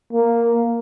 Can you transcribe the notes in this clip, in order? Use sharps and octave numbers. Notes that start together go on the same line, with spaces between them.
A#3